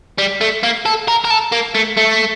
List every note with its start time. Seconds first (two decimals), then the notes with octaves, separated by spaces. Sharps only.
0.18 G3
0.41 A3
0.63 A#3
0.85 A4
1.08 A#4
1.25 A#4
1.30 A4
1.52 A#3
1.75 A3
1.97 A3